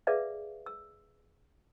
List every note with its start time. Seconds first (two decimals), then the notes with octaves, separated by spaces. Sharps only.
0.07 G#4 A4 B4 D5 E5 F5
0.66 E6